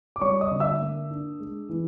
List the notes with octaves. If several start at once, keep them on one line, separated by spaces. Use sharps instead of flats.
D6
G3 C#5 C#6
D#5 D#6
D3
E5 E6
A#3
D4
G#3
E3